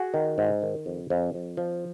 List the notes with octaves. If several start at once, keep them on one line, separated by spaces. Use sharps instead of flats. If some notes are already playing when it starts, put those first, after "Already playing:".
Already playing: F#4 G#4
D#3
G#2
D#3
F2
F2
F2
F3